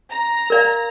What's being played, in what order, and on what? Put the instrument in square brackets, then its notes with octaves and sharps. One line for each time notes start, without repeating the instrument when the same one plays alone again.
[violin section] A#5
[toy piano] A#4 D5 F5